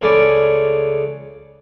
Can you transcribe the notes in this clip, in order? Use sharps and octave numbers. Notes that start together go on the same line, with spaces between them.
C#2 C#3 A3 C#4 B4 D5